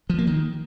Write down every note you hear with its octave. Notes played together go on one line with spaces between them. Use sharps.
F3
A#3
D#3